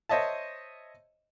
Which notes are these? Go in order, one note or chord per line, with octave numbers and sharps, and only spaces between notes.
C5 C#5 D#5 E5 A5